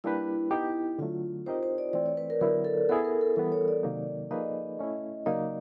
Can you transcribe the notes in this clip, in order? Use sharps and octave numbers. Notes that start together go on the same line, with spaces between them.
G3 A#3 D4 E4 G4 B4
B3 D#4 G4
D3 F#3 A3 F4
C4 D#4 G4 A#4 C5 D#5
C5
D5
E3 A3 C4 D5
C#5
B4
A#4
D3 F#3 B3 E4 A#4
A4
B3 E4 G#4 A4
A#4
A4
E3 G3 B3 A4
C#5
D5
C3 D#3 F#3 A#3 D#4
F3 A#3 D#4 G#4 B4 D#5
A3 C#4 E4
C#3 F#3 A#3 D#4 D5